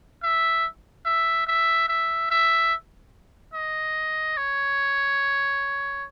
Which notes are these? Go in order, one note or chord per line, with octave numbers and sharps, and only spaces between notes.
E5
E5
E5
E5
E5
D#5
C#5